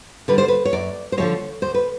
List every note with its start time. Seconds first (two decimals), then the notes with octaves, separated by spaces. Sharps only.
0.28 D3 G3 B4
0.38 C5
0.48 B4
0.65 C#5
0.73 F#2 D5
1.12 C5
1.17 D3 F3 G#3 C#5
1.62 D2 C5
1.74 B4